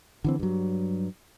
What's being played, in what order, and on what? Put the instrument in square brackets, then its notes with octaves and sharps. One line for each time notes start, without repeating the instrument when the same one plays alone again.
[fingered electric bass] D3 E3 C4
G2 F#3